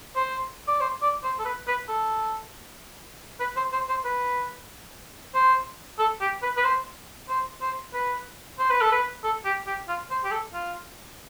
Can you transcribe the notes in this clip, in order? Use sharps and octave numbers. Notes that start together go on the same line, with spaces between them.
C5
D5
C5
D5
C5
A4
B4
B4
A4
B4
C5
C5
C5
B4
C5
A4
G4
B4
B4
C5
C5
C5
B4
C5
B4
A4
B4
A4
G4
G4
F4
C5
G4
A4
F4